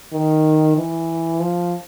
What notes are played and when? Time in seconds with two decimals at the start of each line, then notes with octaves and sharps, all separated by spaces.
0.13 D#3
0.77 E3
1.40 F3